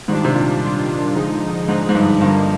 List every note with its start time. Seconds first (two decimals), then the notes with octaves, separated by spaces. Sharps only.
0.08 G#2 D#3 G3 D4 F4
0.25 C3
0.34 A#2
0.61 D#3 G3 D4 F4
1.14 D3 F3 G#3 D#4
1.68 G#2 D3 F3 G#3 D#4
1.89 G#2
1.95 G2
2.21 G2 D3 F3 A#3 D#4